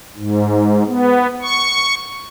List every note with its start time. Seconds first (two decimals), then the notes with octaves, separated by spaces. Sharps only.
0.16 G#2
0.87 B3
1.42 C#6